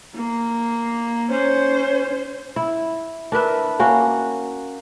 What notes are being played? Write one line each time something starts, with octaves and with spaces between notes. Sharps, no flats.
A#3
C#4 C5
E4
D4 A#4 B4 E5
A#3 C#4 F#4